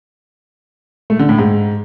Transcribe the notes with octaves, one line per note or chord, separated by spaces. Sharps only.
A3
D3
A2
G#2